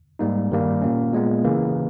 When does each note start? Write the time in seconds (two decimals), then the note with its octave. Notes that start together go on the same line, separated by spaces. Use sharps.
0.19 G#2 G3 A#3 D#4
0.51 G2 D#3 G3 A#3
0.82 A#2 A#3 C#4
1.13 A#2 G#3 B3
1.44 C#3 E3 A#3